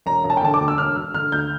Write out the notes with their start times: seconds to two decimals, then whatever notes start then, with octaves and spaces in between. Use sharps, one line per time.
0.06 E1 A#5
0.24 E1
0.30 A5
0.37 G5
0.42 D3 A5
0.54 D6
0.61 D2
0.68 E6
0.77 E1 F6
0.96 E1 F6
1.14 D3 F6
1.32 D2 G6